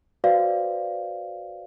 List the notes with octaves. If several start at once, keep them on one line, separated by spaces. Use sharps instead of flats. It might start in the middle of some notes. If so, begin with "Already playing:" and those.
F#4 B4 C5 D5 F5